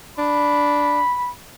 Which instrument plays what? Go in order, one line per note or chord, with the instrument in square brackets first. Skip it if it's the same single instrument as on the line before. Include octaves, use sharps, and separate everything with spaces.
[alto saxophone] D4 [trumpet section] B5